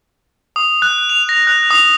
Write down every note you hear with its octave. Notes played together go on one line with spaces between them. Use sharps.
D#6
F#6
F7
A#6
F#6
D#6